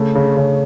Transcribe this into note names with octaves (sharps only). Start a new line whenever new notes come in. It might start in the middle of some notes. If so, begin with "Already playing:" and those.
Already playing: C#3 A3
C#3
C#3